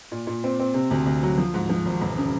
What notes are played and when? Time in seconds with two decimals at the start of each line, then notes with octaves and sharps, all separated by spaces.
0.12 A#2
0.27 A#2
0.44 C4
0.59 C4
0.74 C3
0.91 D2
1.06 D2
1.23 F#3
1.38 F3
1.54 G#2
1.69 F3
1.86 G#1
2.01 E1
2.17 C#3